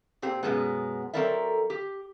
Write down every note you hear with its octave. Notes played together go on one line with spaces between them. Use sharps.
A#2 C4 G4
F#2 B2 G#3 B3
F#3 C4 A4 A#4 D5 E5
G4